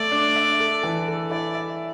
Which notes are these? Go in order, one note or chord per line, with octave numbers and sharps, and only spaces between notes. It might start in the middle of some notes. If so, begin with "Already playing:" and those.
Already playing: A3 D5
D4
E5
A4
E3
A4
E4 D5
E5